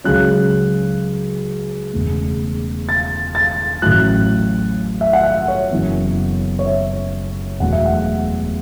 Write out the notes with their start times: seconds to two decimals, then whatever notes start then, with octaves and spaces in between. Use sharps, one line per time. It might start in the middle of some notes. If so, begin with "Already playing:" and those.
0.04 C#2 C#3 F#3 C#4 F#6
1.93 E1 E2 C#3 A3
2.89 A6
3.35 A6
3.82 A1 A2 F#3 F#6
5.01 E5
5.13 F#5
5.23 E5
5.48 C#5
5.71 F#1 F#2 E3 B3
6.59 C#5
6.66 E5
7.59 E1 E2 B2 F#3 A3 F#5
7.73 E5
7.86 F#5